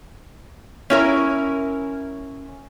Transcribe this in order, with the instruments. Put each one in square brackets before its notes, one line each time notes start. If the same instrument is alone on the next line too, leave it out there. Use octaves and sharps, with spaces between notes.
[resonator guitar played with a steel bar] C#4 E4 A#4